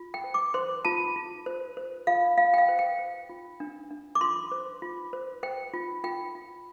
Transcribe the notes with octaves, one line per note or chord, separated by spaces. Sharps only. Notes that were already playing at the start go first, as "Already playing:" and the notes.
Already playing: F4
G5
C5
D6
C5 C6
F4 A5
F4
C5
C5
F4 F5
F4 F5
G5
F5
C5
G5
C5
F4
D4
D4
D6
F4 C6
C5
F4
C5
C5 G5
F4
F4 G5
F4